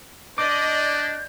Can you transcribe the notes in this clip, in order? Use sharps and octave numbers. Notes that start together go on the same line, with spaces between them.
D4 D5 D#5 D6 G6